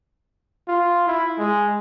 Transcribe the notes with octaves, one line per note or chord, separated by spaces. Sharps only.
F4
E4
G#3